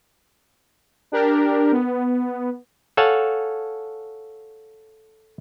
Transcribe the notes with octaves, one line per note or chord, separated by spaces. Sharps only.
D4 G4 A#4
B3
A4 C#5 F5 F#5 G#5 A5